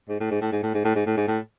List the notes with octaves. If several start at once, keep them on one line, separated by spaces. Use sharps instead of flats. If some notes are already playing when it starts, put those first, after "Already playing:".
G#2
A2
G#2
A2
G#2
A2
G#2
A2
G#2
A2
G#2
A2